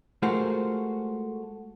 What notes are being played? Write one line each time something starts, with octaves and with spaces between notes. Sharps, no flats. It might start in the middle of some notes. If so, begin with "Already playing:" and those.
G#3 A3 F4 F#4 A#4 C5